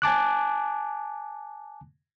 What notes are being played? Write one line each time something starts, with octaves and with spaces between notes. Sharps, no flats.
G#5 A5 D6 F#6